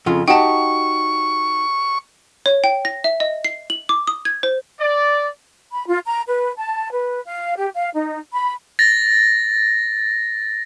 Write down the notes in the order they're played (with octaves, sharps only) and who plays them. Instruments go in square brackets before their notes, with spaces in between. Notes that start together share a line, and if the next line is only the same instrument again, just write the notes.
[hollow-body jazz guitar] F2 C#3 F4
[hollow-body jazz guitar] D#4 F#4 G4 [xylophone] G5 A5 [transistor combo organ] C#6
[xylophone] C#5
G5
A#6
E5
D#5
C7
F#7
D6
D#6
G#6
C5
[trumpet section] D5
[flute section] B5
F4
A#5
B4
A5
B4
F5
G4
F5
D#4
B5
[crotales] A6 A#6